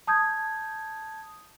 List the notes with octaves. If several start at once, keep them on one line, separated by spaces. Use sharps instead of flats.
A5 D#6 G6 G#6